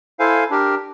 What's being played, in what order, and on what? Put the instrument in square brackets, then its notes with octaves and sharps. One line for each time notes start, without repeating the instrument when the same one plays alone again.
[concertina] E4 A4 C5 F5 G#5
D4 G4 A#4